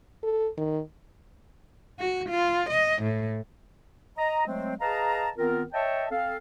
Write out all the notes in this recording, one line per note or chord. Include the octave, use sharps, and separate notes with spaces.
A4
D#3
F#4
F4
D#5
A2
D#5 A#5
F#3 G#3 A3 C4
G#4 B4 D#5 F5 A5 A#5
D#3 B3 C4 F4 A#4
C#5 D#5 E5 G5 A5
C4 A4 F5